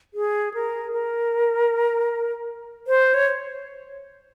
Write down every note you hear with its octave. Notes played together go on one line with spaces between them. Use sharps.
G#4
A#4
A#4
C5
C#5